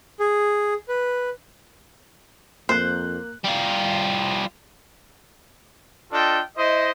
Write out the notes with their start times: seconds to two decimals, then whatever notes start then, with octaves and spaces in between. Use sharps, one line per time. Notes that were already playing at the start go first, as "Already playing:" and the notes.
0.20 G#4
0.88 B4
2.69 F2 A#3 C5 F#6
3.45 G3 F4
6.12 D4 F4 A4 D#5 G5
6.56 E4 C5 D#5